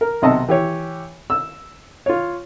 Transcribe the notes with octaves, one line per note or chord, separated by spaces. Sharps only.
A#4
B1 C3 D#5 A5 E6
E3 G4 C#5
E6
F4 C#5